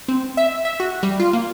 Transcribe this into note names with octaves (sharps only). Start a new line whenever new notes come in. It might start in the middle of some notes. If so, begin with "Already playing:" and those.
C4
E5
E5
F#4
G3
F4
A#3